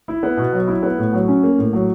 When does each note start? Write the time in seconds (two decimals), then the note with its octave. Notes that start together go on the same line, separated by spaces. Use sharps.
0.08 E4
0.23 B3
0.37 B2
0.53 F#3
0.67 E4
0.83 B3
0.98 A2
1.13 F#3
1.28 C#4
1.43 A#3
1.58 A2
1.73 F#3